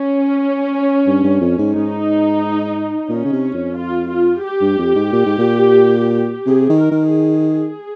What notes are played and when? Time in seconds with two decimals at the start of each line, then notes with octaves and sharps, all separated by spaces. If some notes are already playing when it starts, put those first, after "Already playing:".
Already playing: C#4
1.07 G2
1.24 G2
1.41 F2
1.58 G#2
1.75 G#2 D#4
3.09 A#2 C#4
3.25 C#3
3.32 C3
3.54 F2
3.77 F4
4.11 F4
4.44 G4
4.61 G2
4.78 F2
4.96 G#2
5.12 A#2
5.26 G#2
5.38 A#2
6.46 C3 G#4
6.69 D#3
6.81 A#4
6.91 D#3
7.14 G#4